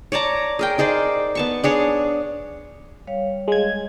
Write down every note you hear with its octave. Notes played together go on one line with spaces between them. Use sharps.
C#5 D5 A5 A#5
G#4 A#4 G5
D#4 G#4 C5 D5
B3 A5 C#6
D4 G#4 C#5
G3 C#5 F5
G#3 G#6